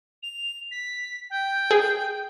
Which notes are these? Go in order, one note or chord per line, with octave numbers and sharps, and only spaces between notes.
F7
B6
G5
G#4